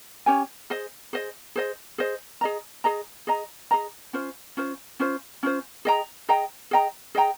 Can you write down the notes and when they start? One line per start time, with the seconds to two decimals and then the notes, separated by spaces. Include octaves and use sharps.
0.26 C#4 G4 C#5 G#5
0.70 G#4 C5 D#5
1.13 G#4 C5 D#5
1.56 G#4 C5 D#5
1.98 G#4 C5 D#5
2.41 G#4 D#5 A#5
2.84 G#4 D#5 A#5
3.27 G#4 D#5 A#5
3.71 G#4 D#5 A#5
4.13 C#4 F4 C5
4.57 C#4 F4 C5
5.00 C#4 F4 C5
5.43 C#4 F4 C5
5.85 G#4 D#5 G5 A#5
6.29 G#4 D#5 G5 A#5
6.71 G#4 D#5 G5 A#5
7.15 G#4 D#5 G5 A#5